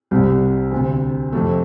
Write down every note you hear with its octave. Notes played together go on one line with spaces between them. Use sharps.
C2 C3 G3
D2 C3
F2 C3 A3